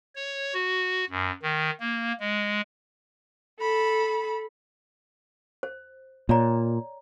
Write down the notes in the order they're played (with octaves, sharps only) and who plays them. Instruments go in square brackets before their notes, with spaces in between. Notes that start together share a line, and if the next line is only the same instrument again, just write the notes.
[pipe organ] C#5
F#4
F#2
D#3
A#3
G#3
[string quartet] A4 B5
[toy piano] C5
[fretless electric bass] A#2 [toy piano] C#5 D5 A#5